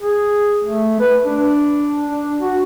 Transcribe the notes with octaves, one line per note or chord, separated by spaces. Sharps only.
G#4
A3
B4
D4
D4
F#4